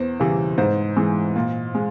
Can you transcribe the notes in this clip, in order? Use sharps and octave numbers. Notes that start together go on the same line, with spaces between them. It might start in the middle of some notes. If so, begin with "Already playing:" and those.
Already playing: E2 C5
C#3 E3 G3
G#2 C5
E3 G#3
A#2
G#3